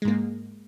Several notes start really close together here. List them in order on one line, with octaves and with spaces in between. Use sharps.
G#3 G#2 A#3